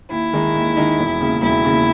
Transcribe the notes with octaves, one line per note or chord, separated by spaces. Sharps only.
D#2 E4
D#3 G#3 D#4
D#2
D#3 G#3 D#4
E1
D#2 C#3
E1 E4
D#2 C#3